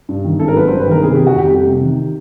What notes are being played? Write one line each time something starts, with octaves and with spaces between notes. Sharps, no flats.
G2
D#3
G#1 A4
A#4
F#3 B4
G2 C5
B4
D#3 A#4
C3 G#4
D#3 G4
F#4
F2 G4
G3 G4
C3
D#3